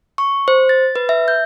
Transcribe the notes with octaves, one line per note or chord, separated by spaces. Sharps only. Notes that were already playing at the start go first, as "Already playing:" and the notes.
C#6
C5
A6
B4
E5
G6